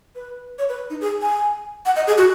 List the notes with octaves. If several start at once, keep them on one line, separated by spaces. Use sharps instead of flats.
B4
C#5
B4
D#4
G#4
G#5
F#5
D#5
G#4
F#4